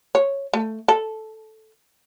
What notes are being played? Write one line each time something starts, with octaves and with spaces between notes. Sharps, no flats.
C#5
A3
A4